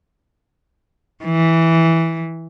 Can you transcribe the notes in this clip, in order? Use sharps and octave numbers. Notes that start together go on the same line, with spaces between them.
E3